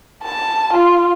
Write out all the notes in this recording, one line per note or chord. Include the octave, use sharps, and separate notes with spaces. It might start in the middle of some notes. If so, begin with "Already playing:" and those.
A5
F4